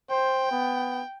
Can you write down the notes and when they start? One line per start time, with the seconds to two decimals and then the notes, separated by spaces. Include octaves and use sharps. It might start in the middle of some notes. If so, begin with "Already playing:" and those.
0.10 C5 G5
0.51 B3